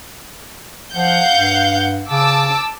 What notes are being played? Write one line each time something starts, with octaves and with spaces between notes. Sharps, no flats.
F3 F5 F#5 G6
G2
C#3 A5 D6 E6